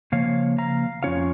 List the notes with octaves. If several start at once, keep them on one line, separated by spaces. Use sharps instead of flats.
C#3 F3 A#3 C#5 F5
F5 A#5
F2 F3 C#4 F4 C#5 F5